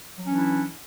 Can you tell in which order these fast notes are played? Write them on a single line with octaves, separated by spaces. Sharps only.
F#3 E3 C#4 D4 E4